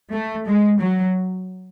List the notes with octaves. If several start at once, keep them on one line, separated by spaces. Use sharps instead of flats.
A3
G#3
F#3